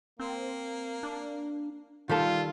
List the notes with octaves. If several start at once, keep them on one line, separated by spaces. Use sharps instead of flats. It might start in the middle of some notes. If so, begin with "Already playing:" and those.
A#3 C4
D4
D#3 G3 F4 G4 A4